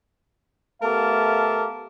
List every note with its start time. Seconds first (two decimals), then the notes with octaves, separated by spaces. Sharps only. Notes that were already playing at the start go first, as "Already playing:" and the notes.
0.82 A3 B3 G4 A#4 F5 A5